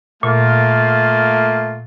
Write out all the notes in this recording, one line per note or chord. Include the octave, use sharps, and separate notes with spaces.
A#2 A3 A#3 F4